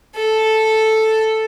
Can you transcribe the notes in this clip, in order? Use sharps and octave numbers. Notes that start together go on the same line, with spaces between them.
A4